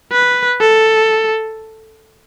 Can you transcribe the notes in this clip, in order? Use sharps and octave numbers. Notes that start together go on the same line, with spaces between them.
B4
A4